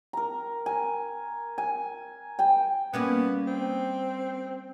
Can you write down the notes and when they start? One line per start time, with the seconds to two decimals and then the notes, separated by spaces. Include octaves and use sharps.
0.13 A#4 A#5
0.66 G#5
1.58 G#5
2.39 G5 G#5
2.94 G3 A#3 B3 C#4
3.47 C4